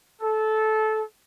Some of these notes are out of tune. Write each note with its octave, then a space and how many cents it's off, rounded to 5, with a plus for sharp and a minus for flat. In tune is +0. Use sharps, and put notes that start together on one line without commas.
A4 -20